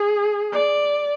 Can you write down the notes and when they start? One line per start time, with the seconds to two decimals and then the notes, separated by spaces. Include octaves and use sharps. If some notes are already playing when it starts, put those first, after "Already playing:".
Already playing: G#4
0.52 D5